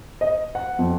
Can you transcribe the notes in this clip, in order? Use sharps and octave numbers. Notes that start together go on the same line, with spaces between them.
D#5
F#5
F2